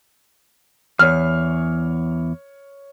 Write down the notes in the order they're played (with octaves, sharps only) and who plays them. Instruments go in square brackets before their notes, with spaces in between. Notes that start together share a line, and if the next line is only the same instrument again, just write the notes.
[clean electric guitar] E2 [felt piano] C#5 F6